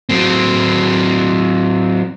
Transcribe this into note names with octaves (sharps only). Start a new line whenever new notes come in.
F#3 C4